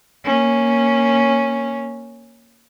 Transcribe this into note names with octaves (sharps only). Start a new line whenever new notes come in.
A#3 C#4